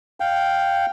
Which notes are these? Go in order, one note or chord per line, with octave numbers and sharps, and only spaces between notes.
F5 G5